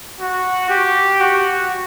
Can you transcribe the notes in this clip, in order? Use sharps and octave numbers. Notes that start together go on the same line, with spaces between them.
F#4
G4
F#4